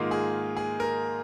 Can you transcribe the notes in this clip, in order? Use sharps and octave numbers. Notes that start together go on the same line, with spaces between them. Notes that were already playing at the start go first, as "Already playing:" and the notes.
Already playing: G#2 D#3 A#3 F4
G#4
G#4
A#4